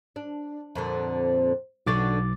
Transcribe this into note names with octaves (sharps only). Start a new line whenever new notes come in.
D4
F2 A#2 D3
B1 D3 D4 F#4 D6 A6